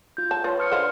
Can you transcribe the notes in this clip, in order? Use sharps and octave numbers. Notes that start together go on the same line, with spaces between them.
F4 G6
A5
F4 B4 C#5
D#6 F6 C#7
D3 C5 F5